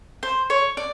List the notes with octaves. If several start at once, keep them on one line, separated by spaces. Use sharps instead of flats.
C5
C#5
D5